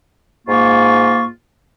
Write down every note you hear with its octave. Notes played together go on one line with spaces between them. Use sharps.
G#2 A#3 F4 C#6